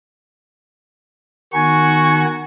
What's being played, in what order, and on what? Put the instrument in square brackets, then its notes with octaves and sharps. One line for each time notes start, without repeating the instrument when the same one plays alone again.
[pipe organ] D#3 B3 D#4 [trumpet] F#4 [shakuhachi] G#5 [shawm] C#6